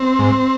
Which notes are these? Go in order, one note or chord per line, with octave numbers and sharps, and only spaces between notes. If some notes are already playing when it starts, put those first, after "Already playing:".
Already playing: C4
G#2